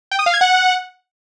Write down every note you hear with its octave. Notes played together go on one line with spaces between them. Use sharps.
G5
D#6
F5
G#6
F#5